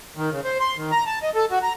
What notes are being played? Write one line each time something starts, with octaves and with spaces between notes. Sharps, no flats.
D#3
C#3
C5
C6
D#3
A#5
A5
D#5
A4
F#4
A#5